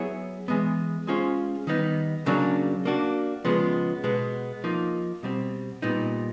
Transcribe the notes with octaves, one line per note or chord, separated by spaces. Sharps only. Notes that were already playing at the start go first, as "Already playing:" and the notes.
Already playing: F#3 B3 E4 G#4 C#5
E3 G#3 B3
G#3 C#4 F4 G#4 C5
D#3 G3 B3 D#4
C#3 F#3 A#3 D4
A#3 D4 F#4
C#3 F3 G#3 B3
B2 G#3 B3
F3 A#3 D#4
B2 G3 C4
A#2 G3 B3 D#4